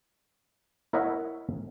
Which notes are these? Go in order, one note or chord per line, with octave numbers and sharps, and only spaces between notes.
E4 A#4 C#5 D#5 E5 F#5